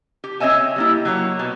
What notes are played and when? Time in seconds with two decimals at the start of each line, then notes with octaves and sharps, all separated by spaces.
0.24 G4
0.40 C4 C#5 D#5 E5 G#5
0.76 G3 A#3 E4
1.05 F#3 A#3 C#5
1.39 B2